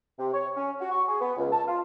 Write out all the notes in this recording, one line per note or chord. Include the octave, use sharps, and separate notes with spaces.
C3
C#5
C#4
F#4
C#6
G#4
B3
C#2
A5
F4